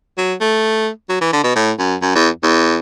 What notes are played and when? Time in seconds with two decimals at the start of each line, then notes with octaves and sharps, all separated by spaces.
0.18 F#3
0.40 A3
1.09 F#3
1.21 E3
1.33 D3
1.44 B2
1.56 A2
1.79 F#2
2.02 F#2
2.15 E2
2.43 E2